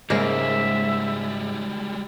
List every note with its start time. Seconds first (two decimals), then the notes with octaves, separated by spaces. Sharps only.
0.10 G#2 C#3 G3 G#3 A#3 E5